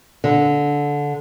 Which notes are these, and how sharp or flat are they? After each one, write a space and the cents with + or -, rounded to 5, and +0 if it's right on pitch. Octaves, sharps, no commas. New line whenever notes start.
D3 -15